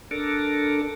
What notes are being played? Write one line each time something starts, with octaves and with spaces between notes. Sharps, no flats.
D4 A4 A#4